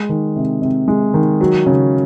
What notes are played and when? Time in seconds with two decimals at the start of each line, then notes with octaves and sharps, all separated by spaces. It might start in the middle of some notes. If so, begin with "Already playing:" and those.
Already playing: G#3
0.09 D#3
0.36 C3
0.62 C3
0.88 G#3
1.14 D#3
1.41 F#3
1.66 C#3